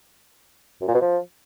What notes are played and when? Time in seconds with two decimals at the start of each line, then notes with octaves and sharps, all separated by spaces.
0.81 F#2
0.88 A#2
0.94 B2
1.01 F3